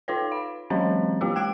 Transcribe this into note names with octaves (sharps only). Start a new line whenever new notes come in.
D#4 F4 B4 C#5
F5
E3 F#3 G#3 C4 C#4 C5
G#3 A#3 F4 G4
G5 F#6 G#6 D7